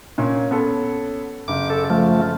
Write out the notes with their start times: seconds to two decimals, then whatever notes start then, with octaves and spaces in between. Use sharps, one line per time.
0.18 A#2 C#4
0.51 B3 C#4 A4
1.48 F#1 D6
1.70 A4
1.90 F3 A3